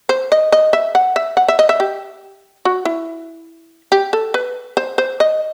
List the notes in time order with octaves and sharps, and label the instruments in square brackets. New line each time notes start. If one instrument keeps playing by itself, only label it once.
[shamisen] C5
D#5
D#5
E5
F#5
E5
F#5
E5
D#5
E5
G4
F#4
E4
G4
A4
B4
C5
C5
D#5